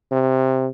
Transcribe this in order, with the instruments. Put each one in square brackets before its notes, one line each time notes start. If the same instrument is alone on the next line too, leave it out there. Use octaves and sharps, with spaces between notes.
[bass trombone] C3